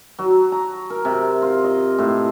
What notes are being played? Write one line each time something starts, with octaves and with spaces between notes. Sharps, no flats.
F#3
A#5
A#4
C3
F4
D#5
A2